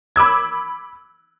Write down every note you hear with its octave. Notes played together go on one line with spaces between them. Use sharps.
B5 D6 E6 G#6